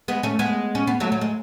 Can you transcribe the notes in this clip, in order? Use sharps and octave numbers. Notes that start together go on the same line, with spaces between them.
G#3 B3
A3 C#4
G#3 B3
C#4
B3
F#3 A3
F#3
G#3